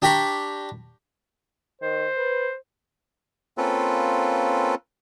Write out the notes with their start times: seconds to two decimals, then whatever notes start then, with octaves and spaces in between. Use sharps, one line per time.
0.02 D4 G4 G5 A#5 B5 C#6
1.82 D#3 C5
2.17 B4
3.58 A#3 C4 C#4 F4 A4 B4